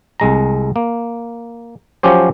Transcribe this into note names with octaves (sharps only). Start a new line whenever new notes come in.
C2 G#3 A#5
A#3
F3 F#3 C#4 G4 C5